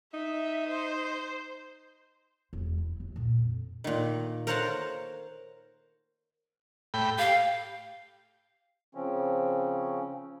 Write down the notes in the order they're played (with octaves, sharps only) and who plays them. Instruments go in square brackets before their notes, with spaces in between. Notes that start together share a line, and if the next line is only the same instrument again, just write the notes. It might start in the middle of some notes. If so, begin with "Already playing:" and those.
[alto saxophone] D#4 [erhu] E5
[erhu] C5
[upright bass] E1 B2
E4
D#2
D2 A#2
F2
[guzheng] A#2 D#3
A#4 C5 C#5 F5 F#5 A5
[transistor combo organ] A2 G5 B5
[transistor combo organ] G4 [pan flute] F5
[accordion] C#3 F3 C4 C#4